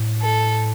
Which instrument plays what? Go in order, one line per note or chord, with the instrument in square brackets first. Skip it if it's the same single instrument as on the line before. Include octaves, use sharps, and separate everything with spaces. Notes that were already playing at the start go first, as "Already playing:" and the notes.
Already playing: [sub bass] A2
[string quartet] A4